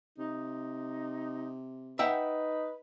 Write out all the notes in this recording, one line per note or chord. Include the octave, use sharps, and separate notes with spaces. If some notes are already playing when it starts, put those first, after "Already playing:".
C3 D#4
D#4 B4 E5 F#5 G5